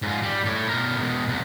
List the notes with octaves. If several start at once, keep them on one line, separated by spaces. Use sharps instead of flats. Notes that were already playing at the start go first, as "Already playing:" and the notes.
G#2 F4
G3
A2 C#5
B2 A#4
B2 G#3
C2